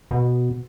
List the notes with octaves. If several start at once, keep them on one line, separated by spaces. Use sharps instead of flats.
B2